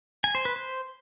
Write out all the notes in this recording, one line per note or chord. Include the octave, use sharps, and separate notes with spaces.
G#5
C5
B4
C5